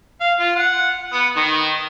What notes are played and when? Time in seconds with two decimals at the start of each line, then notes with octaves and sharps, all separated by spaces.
0.21 F5
0.40 F4
0.56 F#5
1.13 B3
1.36 D#3